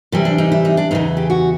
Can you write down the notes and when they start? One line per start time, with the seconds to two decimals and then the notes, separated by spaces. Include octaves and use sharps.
0.12 C3 E3 G3
0.25 D4
0.38 D#4
0.52 E4
0.65 D#4
0.77 D4
0.91 E2 C#3 E3 D#4
1.17 G4
1.30 F#4